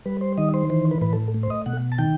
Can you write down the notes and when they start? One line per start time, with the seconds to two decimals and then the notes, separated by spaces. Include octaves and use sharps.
0.06 G3 B4
0.21 C5
0.38 D#3 D#5
0.54 C5
0.70 E3 C5
0.91 B4
1.01 A2 B4
1.13 A4
1.34 A3
1.43 C5
1.50 D#5
1.66 B2 F#5
1.92 A5
1.98 D#3 G5